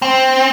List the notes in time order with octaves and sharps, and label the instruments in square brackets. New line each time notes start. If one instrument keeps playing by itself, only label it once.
[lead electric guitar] C4